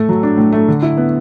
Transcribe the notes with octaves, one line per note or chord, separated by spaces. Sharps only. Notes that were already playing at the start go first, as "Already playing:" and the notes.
Already playing: A2 A3 A4
F#3
D4
A2
A3
D3
E4
B3